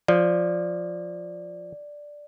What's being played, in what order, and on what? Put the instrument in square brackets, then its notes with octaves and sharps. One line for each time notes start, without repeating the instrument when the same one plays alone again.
[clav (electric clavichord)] F3 [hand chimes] D5